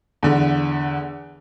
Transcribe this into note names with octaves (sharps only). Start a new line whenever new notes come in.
E2 D3